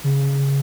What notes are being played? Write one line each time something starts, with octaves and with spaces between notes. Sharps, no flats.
C#3